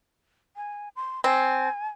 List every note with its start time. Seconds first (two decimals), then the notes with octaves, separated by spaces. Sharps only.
0.56 G#5
0.96 C6
1.24 C4 G#5